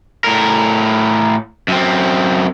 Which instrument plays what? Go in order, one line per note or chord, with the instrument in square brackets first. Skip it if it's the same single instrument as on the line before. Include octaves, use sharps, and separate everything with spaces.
[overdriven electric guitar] A2 A#4
F#2 C4